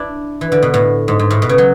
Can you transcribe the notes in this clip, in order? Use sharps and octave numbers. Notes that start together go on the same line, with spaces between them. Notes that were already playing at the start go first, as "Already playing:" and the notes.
Already playing: D4 E4
E3
D3
B2
A2
G#2
G#2
A2
B2
C#3
F#3